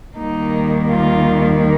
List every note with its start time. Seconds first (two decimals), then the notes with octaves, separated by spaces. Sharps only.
0.18 D#2 D#3 G3 A#3 D#4
0.92 F4